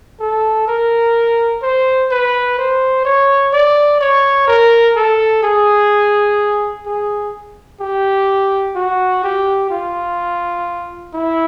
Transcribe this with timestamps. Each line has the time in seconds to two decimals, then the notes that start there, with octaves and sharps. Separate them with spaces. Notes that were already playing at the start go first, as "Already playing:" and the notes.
0.20 A4
0.68 A#4
1.63 C5
2.11 B4
2.59 C5
3.05 C#5
3.53 D5
4.01 C#5
4.48 A#4
4.96 A4
5.43 G#4
6.86 G#4
7.81 G4
8.76 F#4
9.24 G4
9.71 F4
11.14 E4